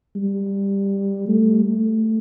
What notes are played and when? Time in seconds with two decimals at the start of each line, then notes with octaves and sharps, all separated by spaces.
0.16 G3
1.28 A3
1.66 A3